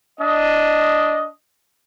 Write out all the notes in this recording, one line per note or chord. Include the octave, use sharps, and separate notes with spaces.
D4 D#5